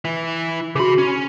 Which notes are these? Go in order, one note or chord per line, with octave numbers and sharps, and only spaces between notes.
E3 E4
C#3 F#4 G#4 B5
C#4